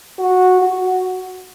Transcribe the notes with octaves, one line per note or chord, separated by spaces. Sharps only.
F#4
F#4